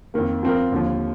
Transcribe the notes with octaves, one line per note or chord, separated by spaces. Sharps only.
F2 D#3 A#3
F3 C4 F4 A#4
D#2 D3 F3